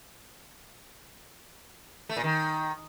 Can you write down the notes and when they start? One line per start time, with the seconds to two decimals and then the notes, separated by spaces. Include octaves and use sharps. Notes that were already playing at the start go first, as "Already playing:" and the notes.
2.09 A3
2.17 A#2
2.24 D#3